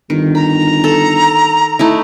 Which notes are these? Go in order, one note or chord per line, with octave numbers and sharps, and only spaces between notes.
G1 D#3
A#5 B5
A4
A3 D#4 E4